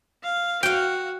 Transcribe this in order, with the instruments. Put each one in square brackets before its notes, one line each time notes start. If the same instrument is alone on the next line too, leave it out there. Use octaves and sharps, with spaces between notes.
[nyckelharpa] F5
[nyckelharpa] F#4 [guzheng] F5 G5